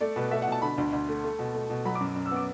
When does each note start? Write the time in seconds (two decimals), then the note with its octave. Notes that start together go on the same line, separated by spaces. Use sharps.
0.01 A3 D5
0.16 B2 B4
0.31 A3 E5
0.42 F#5
0.47 B2 A5
0.62 D3 B5
0.78 D2
0.93 D2
1.09 A3
1.24 A3
1.39 B2
1.54 A3
1.70 B2
1.85 F#3 B5
1.95 D6
2.00 F#2
2.16 F#2
2.26 E6
2.31 B3
2.36 D6